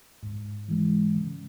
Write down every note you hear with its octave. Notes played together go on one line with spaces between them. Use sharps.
G#2
E3 G#3
C#3